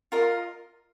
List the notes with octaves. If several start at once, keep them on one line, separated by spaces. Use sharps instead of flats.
F4 A#4 D#5